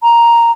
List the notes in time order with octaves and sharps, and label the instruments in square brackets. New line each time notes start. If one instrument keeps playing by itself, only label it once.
[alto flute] A#5